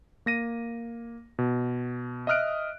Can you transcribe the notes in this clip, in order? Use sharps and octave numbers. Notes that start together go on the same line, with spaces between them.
A#3 A#6 D#7
B2
D#5 E5 D#6 F6 F#6 D7